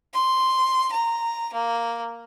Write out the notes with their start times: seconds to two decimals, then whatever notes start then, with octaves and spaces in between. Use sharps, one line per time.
0.13 C6
0.91 A#5
1.52 A#3